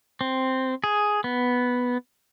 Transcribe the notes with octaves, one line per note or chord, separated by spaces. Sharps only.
C4
G#4
B3